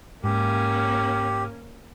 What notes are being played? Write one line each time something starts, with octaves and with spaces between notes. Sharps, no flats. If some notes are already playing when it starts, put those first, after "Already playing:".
G#2 A#3 C#4 G4